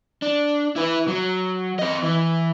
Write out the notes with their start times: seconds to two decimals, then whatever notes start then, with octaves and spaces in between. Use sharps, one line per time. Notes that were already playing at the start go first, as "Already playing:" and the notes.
0.22 D4
0.76 E4 B4
1.08 F#3
1.79 C4 D#5
2.03 E3